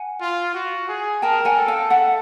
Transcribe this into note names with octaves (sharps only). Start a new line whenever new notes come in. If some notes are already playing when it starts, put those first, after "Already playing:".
Already playing: F#5 G#5
F4
F#4
G#4
A#4 G5 A5
F#5 G#5
A4
F5 G5
A4 E5 F#5